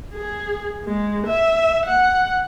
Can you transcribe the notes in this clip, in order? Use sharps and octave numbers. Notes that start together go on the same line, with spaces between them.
G#4
G#3
E5
F#5